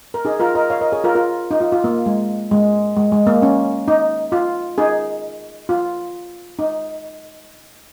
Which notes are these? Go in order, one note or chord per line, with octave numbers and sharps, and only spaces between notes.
A#4
D#4 G#4
F4 A#4
A#4 D#5
C#5 F5
A#4 D#5
G#4 C#5
F4 A#4
F4 A#4
D#4
F4
F4
A#3
G#3
G#3
G#3
G#3
A#3
C#4
D#4
F4
D#4 G#4
F4
D#4